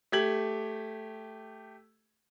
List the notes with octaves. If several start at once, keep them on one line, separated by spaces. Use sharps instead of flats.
A3 G4 G#6 F#7